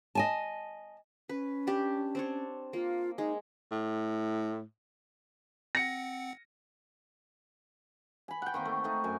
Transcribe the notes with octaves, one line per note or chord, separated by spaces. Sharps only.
D#5 G#5 A5
C#4 B4
D4 G4
C4 D4 C#5
A#3 F4
G#3 D#4
A2
C4 F#5 A#6 C#7
G#5 B5
F#5 G5
D#3 A#3 C4
A3
A3 D#4
F#2 G#5